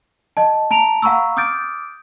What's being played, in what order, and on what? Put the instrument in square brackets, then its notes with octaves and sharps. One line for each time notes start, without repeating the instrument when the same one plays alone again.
[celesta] D#5 A5
A5 A#5 D7 F7
F5 F#5 A#5 B5 C#6 E6
D6 D#6 F6 G6 A6 D7